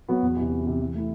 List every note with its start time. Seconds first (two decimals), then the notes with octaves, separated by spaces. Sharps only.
0.09 F#3 B3 F#4
0.22 E2
0.36 C3 E3
0.51 E2
0.66 C3 E3
0.80 E3
0.95 A3 E4